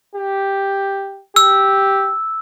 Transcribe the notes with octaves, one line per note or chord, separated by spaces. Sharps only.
G4
G4 E6